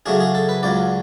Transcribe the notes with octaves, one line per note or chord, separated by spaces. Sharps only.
C#3 F#3 A3 D4 G#4
G#4
A4
B4
C#2 C#3 F#3 D5